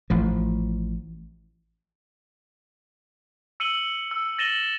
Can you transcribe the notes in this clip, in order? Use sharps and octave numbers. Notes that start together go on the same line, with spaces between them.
A1 F3
E6 C#7 D#7 F#7 G7
E6
A6 A#6 D#7 E7 F#7 G7